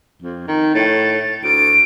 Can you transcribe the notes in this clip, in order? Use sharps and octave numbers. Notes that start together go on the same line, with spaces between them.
F2
D#3
A2 A6
D2 D7